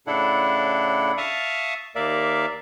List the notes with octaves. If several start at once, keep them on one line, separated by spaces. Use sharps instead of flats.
A2 C#3 D4 E4 A4 F#5
E5 F5 A5 C#6 D#6 F6
D#2 A#3 A#4 D5 E5 F5